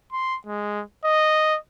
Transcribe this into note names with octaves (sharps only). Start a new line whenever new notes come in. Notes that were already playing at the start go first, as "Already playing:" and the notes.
C6
G#3
D#5